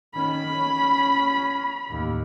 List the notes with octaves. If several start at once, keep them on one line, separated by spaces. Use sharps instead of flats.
D#3 C#4 B5
C#4
A1 D#2